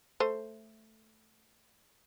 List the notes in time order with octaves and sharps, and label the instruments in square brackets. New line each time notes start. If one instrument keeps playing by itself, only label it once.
[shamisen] A3 C5